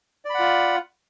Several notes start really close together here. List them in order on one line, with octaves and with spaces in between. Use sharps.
D5 B5 F#5 F4